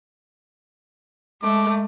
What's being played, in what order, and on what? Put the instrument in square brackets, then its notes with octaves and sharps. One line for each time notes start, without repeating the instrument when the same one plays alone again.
[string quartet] G#3 A3 [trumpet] D6